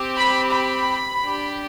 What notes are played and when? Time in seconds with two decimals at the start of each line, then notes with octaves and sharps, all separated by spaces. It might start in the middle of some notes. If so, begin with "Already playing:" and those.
Already playing: C4 G4
0.16 B5
0.51 B5
1.22 D4 G4